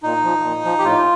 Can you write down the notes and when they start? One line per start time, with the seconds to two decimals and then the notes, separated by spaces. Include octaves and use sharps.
0.03 A#2 D#4
0.24 F3
0.43 A#2
0.64 F3
0.79 G4
0.84 A2 F4